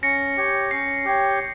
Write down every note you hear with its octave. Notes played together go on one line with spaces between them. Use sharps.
C#4 A#6 C#7
G4 C#5 G5
C#4 C7
G4 C#5 G5